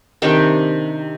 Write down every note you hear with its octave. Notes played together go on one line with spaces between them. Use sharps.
C3 D#3 D4 G5